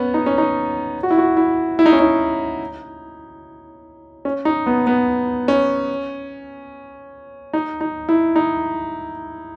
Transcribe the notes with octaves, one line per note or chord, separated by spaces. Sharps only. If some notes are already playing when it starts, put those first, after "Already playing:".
Already playing: B3 C#4
D#4
C#4
D#4
F#4
E4
F#4
E4
E4
D#4
C#4
D#4
C#4
D#4
B3
B3
C#4
D#4
D#4
E4
D#4